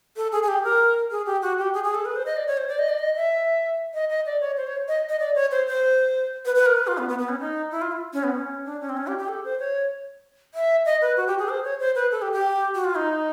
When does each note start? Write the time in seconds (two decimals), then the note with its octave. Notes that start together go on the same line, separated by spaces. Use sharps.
0.16 A4
0.32 G#4
0.43 G#4
0.48 G4
0.63 A#4
1.11 G#4
1.26 G4
1.42 F#4
1.58 G4
1.74 G#4
1.84 G#4
1.95 A4
2.05 B4
2.16 C5
2.26 D#5
2.36 D5
2.47 C#5
2.57 C5
2.68 D5
2.79 D#5
2.89 D5
2.99 D#5
3.15 E5
3.94 D#5
4.09 D#5
4.26 D5
4.41 C#5
4.57 C5
4.67 C#5
4.88 D#5
5.09 D#5
5.20 D5
5.35 C#5
5.51 C5
5.67 C5
6.45 B4
6.55 B4
6.66 A#4
6.77 B4
6.87 F4
6.98 B3
7.09 B3
7.19 B3
7.29 C#4
7.40 D#4
7.71 E4
7.81 F4
7.92 E4
8.13 C#4
8.24 B3
8.35 C#4
8.65 D4
8.81 C#4
8.89 C4
8.97 C#4
9.07 G4
9.18 G4
9.28 A4
9.44 C5
9.60 C#5
10.54 E5
10.86 D#5
11.01 B4
11.17 F#4
11.27 G4
11.39 G#4
11.49 C5
11.64 C#5
11.80 C5
11.95 B4
12.11 A4
12.22 G4
12.33 G4
12.74 F#4
12.85 F4
12.95 D#4